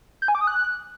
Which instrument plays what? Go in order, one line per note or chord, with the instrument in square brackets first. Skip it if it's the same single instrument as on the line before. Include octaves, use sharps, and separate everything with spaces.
[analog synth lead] G6
G#5
D6
D#6
F#6